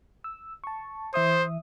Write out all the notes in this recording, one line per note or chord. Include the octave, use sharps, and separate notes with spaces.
E6
A5 C#6
E3 C5 E5 D#6